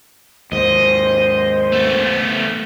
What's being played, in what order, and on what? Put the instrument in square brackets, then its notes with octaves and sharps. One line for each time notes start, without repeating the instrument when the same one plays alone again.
[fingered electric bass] D#2 G#2 [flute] C5 [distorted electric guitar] D#5
[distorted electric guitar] A3 B3